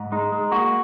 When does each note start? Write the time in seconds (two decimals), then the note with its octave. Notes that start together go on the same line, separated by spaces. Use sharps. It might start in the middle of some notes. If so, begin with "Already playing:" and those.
Already playing: G#2
0.12 G#3 D#4
0.32 G#3
0.51 A#3 F#4